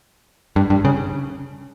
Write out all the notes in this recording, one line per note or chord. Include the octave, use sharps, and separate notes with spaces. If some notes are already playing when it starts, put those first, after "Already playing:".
G2
G2
C#3